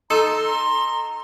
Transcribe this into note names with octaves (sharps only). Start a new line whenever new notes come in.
D#4 A4 A#5 C6